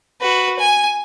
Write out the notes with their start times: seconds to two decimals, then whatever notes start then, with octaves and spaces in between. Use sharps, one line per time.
0.21 F#4 B4
0.59 G#5